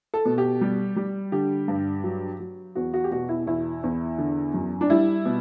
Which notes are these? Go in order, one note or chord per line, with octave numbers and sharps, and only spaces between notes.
A4
B2
G4
G3
G3
D3 G4
G2
F#3
F#3
E2 F#4
F#4
G4
B2 F#4
E4
E2 E4
E2
D3
F#2
D4
G3 E4
B2